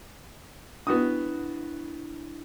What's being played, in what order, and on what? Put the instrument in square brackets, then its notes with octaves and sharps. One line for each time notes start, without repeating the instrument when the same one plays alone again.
[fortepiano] B3 F#4 D#6 [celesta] D4 E4